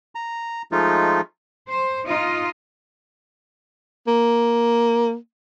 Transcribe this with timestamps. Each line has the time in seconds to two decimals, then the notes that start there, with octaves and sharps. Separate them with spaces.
0.15 A#5
0.72 F3 G#3 A3 D#4 F4
1.69 C5
2.06 D#4 F4 D#5
4.07 A#3